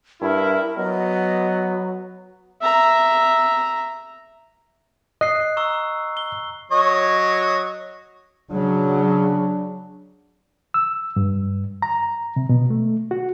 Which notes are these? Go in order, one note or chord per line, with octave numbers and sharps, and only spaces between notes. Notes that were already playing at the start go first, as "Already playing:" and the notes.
G2 E4 A#4
F#3 B3 D#5
E5 A#5
D#5 F#6 C7
A#5 C#6 E6
G7
F#3 C#5 D#5
C#3 F#3 D4
E6
G2
A#5
C3
B2
A3
F#4